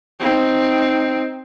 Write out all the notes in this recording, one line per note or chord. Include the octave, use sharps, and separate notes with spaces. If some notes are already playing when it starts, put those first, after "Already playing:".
C4 D#4